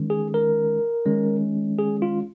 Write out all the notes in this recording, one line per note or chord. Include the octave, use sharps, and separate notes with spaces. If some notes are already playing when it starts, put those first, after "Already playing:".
Already playing: D#3 G#3 C#4
G#4
A#4
D#3 G#3 C#4
G#4
F4